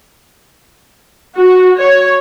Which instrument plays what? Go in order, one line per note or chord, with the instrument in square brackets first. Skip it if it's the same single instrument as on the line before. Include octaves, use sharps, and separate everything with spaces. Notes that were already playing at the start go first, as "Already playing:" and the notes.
[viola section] F#4
C#5